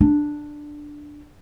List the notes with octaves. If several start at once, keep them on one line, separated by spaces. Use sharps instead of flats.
D4